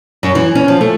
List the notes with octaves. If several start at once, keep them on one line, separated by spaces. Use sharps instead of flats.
F#2
E3
C#4
F3
A3